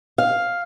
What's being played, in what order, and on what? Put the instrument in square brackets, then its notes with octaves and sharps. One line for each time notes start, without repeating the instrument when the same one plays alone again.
[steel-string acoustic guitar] F5